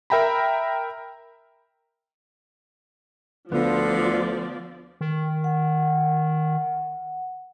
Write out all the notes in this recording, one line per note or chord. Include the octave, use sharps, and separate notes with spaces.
A#4 E5 G5 A#5 B5
D2 D3 F3 B3 F4 D5
D#3
F#5